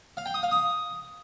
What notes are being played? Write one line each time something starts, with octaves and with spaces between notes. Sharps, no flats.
F5
G5
D#6
F5
D#6